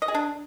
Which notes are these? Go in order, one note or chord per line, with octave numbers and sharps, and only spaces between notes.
D#5
G#4
D4